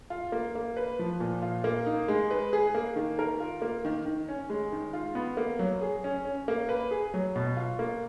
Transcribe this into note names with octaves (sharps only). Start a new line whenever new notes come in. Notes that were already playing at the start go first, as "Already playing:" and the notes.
F4
A#3
A#3
B4
F3
A#2
F4
A#3
D#4
G#3
B4
G#4
A#3
D#3
A#4
F4
A#3
D#3
D#3
C#4
G#3
D#3
F4
B3
A#3
F#3
G#4
C#4
C#4
A#3
B4
G#4
F#3
B2
F4
A#3